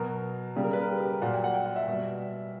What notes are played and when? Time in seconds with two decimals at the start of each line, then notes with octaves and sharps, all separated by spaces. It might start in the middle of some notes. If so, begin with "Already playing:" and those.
Already playing: B2 F#3 A#4
0.56 C#3 G3 G4
0.64 A#4
0.73 B4
0.81 A#4
0.89 G4
1.00 G4
1.11 A#4
1.22 A#2 F#3 F#5
1.33 G5
1.44 F#5
1.54 G5
1.66 F#5
1.76 E5
1.87 B2 G3